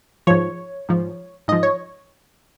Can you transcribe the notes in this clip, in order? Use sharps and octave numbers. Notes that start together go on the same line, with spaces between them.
G#2 F3 C#5
G#2 F3
G#2 F3 D#5
C#5